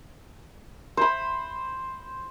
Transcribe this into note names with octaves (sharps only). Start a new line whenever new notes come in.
C5 B5